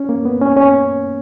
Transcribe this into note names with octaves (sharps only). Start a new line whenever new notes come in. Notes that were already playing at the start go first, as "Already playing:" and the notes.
Already playing: C#4
A#3
B3
C#4
C#4